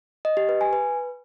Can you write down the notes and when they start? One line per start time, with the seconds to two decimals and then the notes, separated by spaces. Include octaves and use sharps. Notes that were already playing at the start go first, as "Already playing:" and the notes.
0.25 D#5
0.37 G4
0.49 B4
0.61 G#5
0.73 B4